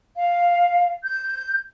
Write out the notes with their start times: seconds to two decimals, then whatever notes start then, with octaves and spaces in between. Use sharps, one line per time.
0.16 F5
1.04 G6